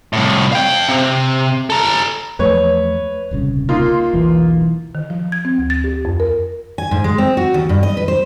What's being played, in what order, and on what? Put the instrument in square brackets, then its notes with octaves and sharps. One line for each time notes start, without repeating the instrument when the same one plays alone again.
[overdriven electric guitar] C2 A2
F5 G5
C3
A4 A#5
[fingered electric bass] E2 F3 A3 [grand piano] B4 C#5
[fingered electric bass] D#1 C2 C#3
[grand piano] A#3 D#4 F4 [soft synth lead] C6
[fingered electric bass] E1 B1 [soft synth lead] E3
[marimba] D#3
F3
G#6
C4
D2
A6
G4
F2
A#4
[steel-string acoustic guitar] G#5
G#2
G#3
C4
F#4
D#2
G2
D#5
B4
C5